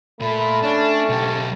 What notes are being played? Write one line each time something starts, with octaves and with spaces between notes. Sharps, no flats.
A#2 A3 B5
C#4 D4 A5
B1 G4